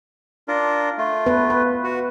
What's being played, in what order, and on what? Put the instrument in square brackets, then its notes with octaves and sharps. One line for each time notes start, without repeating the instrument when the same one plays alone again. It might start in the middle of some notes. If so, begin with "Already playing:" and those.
[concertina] D4 F4 A#4
A3 F4
[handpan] B3 B4
B4
[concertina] F#4